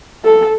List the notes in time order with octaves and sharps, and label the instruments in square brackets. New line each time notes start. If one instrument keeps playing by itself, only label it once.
[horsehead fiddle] A4